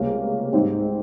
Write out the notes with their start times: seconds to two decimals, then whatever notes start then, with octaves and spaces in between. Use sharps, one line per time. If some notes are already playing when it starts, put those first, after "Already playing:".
Already playing: C#2 C3 G3 A#3 C#4
0.53 G#2 G3 C4 D#4